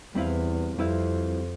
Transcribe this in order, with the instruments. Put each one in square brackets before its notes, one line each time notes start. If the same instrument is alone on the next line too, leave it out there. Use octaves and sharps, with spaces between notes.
[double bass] E2 [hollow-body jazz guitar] G3 C4 E4 B4 F5
[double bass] F2 [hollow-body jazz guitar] G3 C4 E4 B4 F5